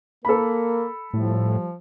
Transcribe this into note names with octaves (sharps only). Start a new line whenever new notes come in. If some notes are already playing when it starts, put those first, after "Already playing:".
A#3 A4 A#4 B5
A2 F3 G3